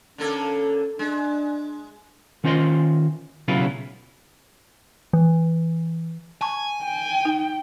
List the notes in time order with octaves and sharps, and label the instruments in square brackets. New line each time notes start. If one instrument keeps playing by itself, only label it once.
[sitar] D3 A#3 A4 [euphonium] C#4
[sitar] G#3 [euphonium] D4
[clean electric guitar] D#3 C#4 F4 C5 D#5 C6
B1 C#3 F#3 E4 F4 B4
[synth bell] E3
[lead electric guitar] G#5 [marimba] A5 C#6
[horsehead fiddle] G5
[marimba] D#4